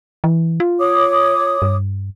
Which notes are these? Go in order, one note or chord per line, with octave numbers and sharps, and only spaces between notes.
E3
F4
C#5 D6 D#6
G2